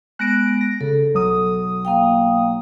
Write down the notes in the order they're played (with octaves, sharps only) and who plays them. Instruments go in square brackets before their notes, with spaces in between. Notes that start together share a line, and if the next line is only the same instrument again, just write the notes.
[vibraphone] G#3 B3 [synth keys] F#6 A#6 D7
[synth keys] A#6
[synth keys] C#3 [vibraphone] A4
[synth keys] B1 F#3 D#6
[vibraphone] A#3 F5 G5